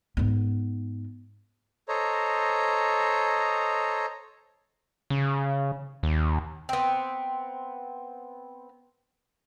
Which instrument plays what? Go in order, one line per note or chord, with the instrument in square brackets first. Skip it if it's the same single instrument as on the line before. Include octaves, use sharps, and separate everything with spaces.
[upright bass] G#2 B3
[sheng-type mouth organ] A4 C5 C#5 D#5 A#5
[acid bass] C#3
D#2
[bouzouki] B3 C4